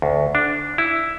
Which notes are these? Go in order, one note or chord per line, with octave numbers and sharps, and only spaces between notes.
D2
D4
E4